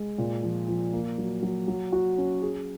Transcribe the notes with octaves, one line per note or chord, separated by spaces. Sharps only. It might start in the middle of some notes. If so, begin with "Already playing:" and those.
Already playing: G#3
A#2
F3
F3
A#3
F#3
F#3
F#3
F#4
C#4
G#4